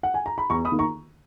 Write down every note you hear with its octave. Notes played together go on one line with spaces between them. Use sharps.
F#5
G#5
A#5
B5
E2 A#5 C#6
B5 D#6
D#3 A#3
A#5 C#6